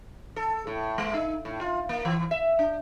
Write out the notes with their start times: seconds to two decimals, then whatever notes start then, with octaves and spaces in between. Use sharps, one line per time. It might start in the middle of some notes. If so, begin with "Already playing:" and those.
0.36 A4
0.67 A2
0.98 G#3
1.14 D#4
1.45 A2
1.61 F4
1.89 A#3
2.05 E3
2.31 E5
2.59 D4